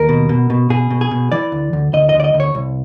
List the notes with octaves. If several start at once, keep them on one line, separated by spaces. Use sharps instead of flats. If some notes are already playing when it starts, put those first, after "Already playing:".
Already playing: D#2 A#4
B2
B2
B2
B2 G#4
B2
G#4
B2
E3 D5
D2
D2
D2 D#5
D#5
D2
D5
D#5
D2
C#5
C2